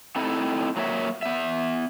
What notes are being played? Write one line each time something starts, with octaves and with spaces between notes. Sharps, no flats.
A3 C4 D#4 E4 A4
F#3 A#3 C#5 E5
B3 E5